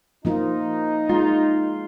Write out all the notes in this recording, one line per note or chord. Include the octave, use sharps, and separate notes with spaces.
F3 A#3 D#4 F4
G#3 F4